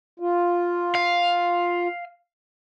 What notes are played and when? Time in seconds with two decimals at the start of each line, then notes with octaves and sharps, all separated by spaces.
0.20 F4
0.95 F5